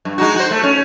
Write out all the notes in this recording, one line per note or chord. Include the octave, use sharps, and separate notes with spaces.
G2
G#3 D#4 F#4
F#4 C5
A3
C#4